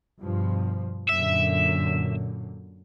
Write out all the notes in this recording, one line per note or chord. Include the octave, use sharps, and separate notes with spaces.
G2 B2 F3
F#2 A#2 D3 E5